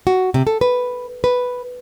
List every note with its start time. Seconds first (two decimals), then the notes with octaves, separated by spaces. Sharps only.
0.07 F#4
0.34 C3
0.47 A4
0.61 B4
1.24 B4